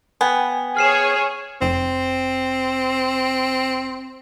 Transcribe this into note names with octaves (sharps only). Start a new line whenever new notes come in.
B3 G5 G#5
G#4 C#5 F6 C7 E7
F1 C4